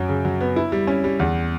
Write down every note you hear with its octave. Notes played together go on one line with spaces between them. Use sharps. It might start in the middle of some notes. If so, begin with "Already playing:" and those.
Already playing: F#2 F#3
C#3
F#3
B3
E4
G3
C#4
G3
E2